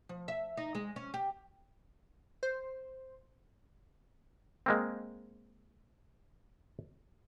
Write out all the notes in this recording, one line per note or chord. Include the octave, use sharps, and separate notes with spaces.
F3
E5
D#4
G#3
C#4
G4
C5
G#3 A#3 C4